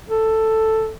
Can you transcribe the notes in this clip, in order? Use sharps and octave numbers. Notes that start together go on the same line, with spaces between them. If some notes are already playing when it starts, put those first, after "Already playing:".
A4